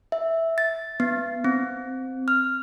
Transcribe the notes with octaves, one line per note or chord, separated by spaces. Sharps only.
E5
A6
B3
C4
F6